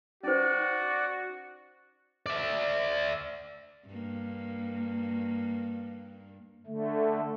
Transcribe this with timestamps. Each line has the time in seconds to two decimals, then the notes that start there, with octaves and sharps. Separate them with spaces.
0.23 C#4 D#4 F#4 C5 D5
2.26 D5 E5
3.87 G2 A#3
6.66 D3 A3